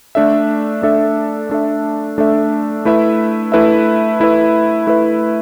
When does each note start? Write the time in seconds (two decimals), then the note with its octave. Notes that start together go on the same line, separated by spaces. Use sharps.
0.15 A3 D4 A4 E5
0.82 A3 D4 A4 E5
1.50 A3 D4 A4 E5
2.18 A3 D4 A4 E5
2.85 A3 E4 B4 E5
3.52 A3 E4 B4 E5
4.20 A3 E4 B4 E5
4.87 A3 E4 B4 E5